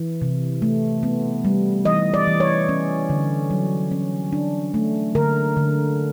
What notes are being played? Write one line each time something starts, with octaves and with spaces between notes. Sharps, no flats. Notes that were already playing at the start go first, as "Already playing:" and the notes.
Already playing: E3
C3
A3
B3
G3
E3 D#5
D5
E3
C#5
C#4
D3
F#3
C#4
D4
A3
D3 A#4
D3